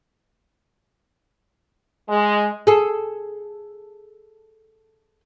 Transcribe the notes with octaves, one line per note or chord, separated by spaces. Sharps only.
G#3
G#4 A4